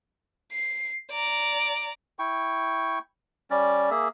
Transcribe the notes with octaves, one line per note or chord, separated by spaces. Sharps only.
C7
D5 A#5
E4 G5 C#6
G3 C#4 D5
A#3 G#4 E5